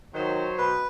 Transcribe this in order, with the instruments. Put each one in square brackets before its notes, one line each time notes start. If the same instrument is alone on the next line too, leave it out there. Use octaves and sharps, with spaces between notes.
[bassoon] D#3 [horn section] F#3 C5
[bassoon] B2 [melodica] B4